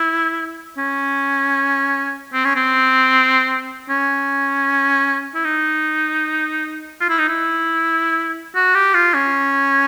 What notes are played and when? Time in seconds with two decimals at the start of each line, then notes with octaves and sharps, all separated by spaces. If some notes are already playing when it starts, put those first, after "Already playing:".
Already playing: E4
0.78 C#4
2.33 C4
2.45 C#4
2.56 C4
3.89 C#4
5.35 E4
5.44 D#4
7.01 F4
7.09 E4
7.19 D#4
7.29 E4
8.55 F#4
8.75 G4
8.94 F4
9.14 C#4